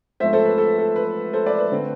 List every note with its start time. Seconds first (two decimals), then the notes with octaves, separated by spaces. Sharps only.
0.20 G#2 F3 A3 C4 C5 E5
0.33 A4 C5
0.45 B4
0.58 A4
0.78 A4
0.96 B4
1.33 A4 C5
1.46 B4 D5
1.59 B4
1.72 D3 A3 C4